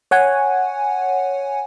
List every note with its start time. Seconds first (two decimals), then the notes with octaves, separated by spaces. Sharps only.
0.11 C#5 F#5 G#5